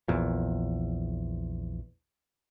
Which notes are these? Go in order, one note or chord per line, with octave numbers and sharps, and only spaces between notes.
A#1 E2 A#2